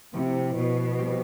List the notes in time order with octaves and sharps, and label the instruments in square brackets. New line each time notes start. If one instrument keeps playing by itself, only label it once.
[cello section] C3 [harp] F3 A3 E4
[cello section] B2
[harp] G3 C4 G4